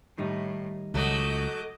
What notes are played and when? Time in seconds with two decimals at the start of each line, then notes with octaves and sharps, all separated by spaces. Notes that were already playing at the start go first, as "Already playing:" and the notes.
0.18 A2 D#3 G3 D#4
0.94 C#2 F#3 A3 D#5 D6 G6